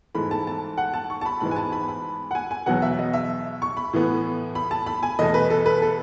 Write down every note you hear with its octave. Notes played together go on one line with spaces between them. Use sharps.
G#2 E3 A3 B5
A5
A5
F#5
A5
C#6
A5
B5
G#2 E3 G#3 B3 B5
G#5
A5
B5
B5
F#5
G#5
G#5
E2 B2 F#3 B3 F#5
E5
D#5
E5
C#6
B5
A2 E3 B3
B5
A5
B5
G#5
E2 B2 A3 D#5
B4
A4
B4
A4